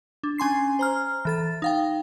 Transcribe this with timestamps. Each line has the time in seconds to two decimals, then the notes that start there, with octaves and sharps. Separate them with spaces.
0.23 D4
0.38 C#4 G#5 C6 C7
0.79 C5 A#5 F6
1.25 E3 A4 A6
1.62 D#4 F5 G5